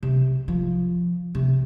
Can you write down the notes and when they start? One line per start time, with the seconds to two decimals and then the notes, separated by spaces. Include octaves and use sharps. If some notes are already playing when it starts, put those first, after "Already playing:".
0.03 C3
0.48 F3
1.35 C3